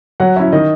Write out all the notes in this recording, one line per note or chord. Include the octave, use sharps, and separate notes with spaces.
F#3 F#5
C#4 E4 E5
D#3 D#5